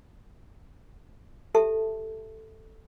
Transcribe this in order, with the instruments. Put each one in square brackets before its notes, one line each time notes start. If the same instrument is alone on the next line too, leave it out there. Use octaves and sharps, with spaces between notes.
[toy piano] G4 A4 E5 A5